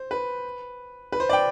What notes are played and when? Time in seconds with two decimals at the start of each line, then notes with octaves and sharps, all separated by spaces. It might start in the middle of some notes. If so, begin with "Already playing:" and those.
Already playing: C5
0.11 B4
1.12 B4
1.20 C5
1.29 D5 G5